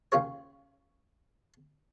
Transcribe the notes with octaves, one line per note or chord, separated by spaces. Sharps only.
D#2 C#3 F4 G#4 C#5